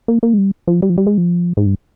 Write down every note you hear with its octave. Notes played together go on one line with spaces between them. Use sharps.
A#3
A#3
G#3
G3
F3
G3
F3
G3
G#3
F3
G#2
G2